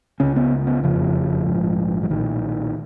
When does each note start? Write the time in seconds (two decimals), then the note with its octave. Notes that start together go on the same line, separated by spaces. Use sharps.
0.20 C#2 C#3 C#4
0.36 B3
0.67 B3
0.83 F#1 F2 C#3 F3
1.46 A#1 G#2
2.03 F3
2.10 B1 A#2 D#3